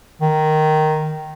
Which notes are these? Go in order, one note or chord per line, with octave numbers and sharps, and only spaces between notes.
D#3